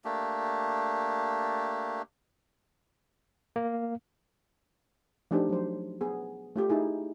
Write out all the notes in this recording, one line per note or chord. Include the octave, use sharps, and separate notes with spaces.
A3 A#3 D4 G4
A#3
F3 A3 D4 D#4 G4 C5
F#3 C5
B3 G#4
A3 F4 G4
D#4 E4 G#4